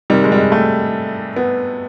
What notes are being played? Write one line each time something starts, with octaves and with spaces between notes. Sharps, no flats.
C3 D#3 G3
G#3
G3
G#3
A3
B3